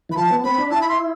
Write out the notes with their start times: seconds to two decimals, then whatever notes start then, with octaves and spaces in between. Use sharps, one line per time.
0.09 E3 B5
0.16 F3 A5
0.31 B3
0.44 C4 B5
0.58 D4
0.71 E4 A5
0.81 B5
0.89 C6